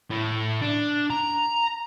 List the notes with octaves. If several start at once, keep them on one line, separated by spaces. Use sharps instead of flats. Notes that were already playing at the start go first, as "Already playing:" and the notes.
A2
D4
A#5